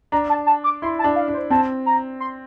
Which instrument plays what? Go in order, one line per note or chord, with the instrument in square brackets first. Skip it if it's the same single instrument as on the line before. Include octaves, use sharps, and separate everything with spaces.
[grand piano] D4 [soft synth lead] A#5
[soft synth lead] A5
A5
D6
[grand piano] E4 [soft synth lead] C6
[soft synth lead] A5
[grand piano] D4
[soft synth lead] F5
[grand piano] D4
[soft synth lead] C5
[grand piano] C4 [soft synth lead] A5
[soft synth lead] A#5
C6